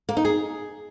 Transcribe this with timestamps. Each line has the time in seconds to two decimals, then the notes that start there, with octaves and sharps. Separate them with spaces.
0.09 A#3
0.17 D#4
0.25 G#4